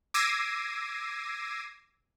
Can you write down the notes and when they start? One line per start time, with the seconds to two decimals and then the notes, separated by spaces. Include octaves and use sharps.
0.14 D6 E6 G#6 A#6 C7 D#7